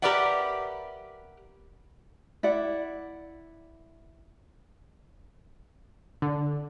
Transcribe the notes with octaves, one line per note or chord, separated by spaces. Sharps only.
G4 A#4 B4 D5 E5 F#5
E4 D5 F#5
D3